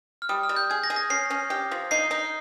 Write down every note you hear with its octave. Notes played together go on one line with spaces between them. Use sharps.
F6
G3 D#6
F6
G3
G6
G#4 G#6
A#6
G#4
A#6
C#4 C7
C#4
G4
F3
D#4 C7
D#4